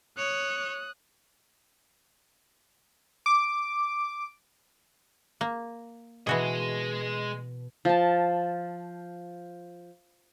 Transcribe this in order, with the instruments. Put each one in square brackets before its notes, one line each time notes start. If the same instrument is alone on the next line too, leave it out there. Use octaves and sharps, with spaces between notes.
[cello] C#5 [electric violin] D#6 F#6
[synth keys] D6
[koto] A#3
[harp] B2 [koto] E3 F#4 G#4 [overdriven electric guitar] G#3 D#5
[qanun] F3 A5